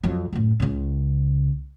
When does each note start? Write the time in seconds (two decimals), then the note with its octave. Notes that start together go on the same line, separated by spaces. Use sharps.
0.03 F2 F#3
0.33 F#2 A2
0.60 C#2 C#3